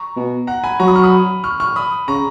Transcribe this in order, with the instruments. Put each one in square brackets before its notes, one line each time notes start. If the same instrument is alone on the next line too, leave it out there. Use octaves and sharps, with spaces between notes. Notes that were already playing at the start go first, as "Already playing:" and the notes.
Already playing: [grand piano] A#5 C#6
[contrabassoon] B2
[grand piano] F#5 A#5
G#5 B5
[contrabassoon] F#3 [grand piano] A#5 C#6
[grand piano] B5 D#6
C#6 F6
B5 D#6
C#6 F6
C#6 F6
B5 D#6
[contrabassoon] C#3 [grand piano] A#5 C#6